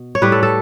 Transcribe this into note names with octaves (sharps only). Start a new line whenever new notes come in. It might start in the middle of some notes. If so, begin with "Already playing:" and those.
Already playing: B2
C#5
A2 G3 B4
A4
A4